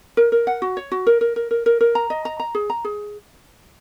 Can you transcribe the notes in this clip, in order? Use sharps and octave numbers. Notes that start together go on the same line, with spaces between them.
A#4
A#4
F#5
F#4
C#5
F#4
A#4
A#4
A#4
A#4
A#4
A#4
A#5
D#5
A#5
A#5
G#4
A#5
G#4